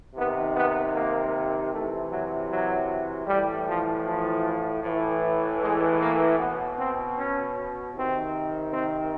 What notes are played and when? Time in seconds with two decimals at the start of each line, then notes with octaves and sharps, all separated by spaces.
0.15 C3 D#3 B3
0.54 B3
0.94 A#3
1.71 C3 E3 A3
2.10 F#3
2.49 F#3
3.26 A2 E3 G3
3.66 F3
4.05 F3
4.82 A2 E3
5.61 G#3
5.99 A#3
6.39 B2 B3
6.77 C4
7.16 C#4
7.93 C3 D#3 C4
8.72 C4